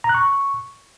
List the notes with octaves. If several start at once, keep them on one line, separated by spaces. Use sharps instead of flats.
A#5
F#6
C#6